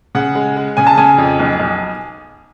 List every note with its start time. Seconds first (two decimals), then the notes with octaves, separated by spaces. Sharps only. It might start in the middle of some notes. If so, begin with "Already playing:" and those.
0.15 C#3 F#5
0.35 G#3
0.56 G#3
0.77 C#3 G#5
0.87 A5
0.98 C#3 G#5
1.18 F2
1.40 B1
1.60 B1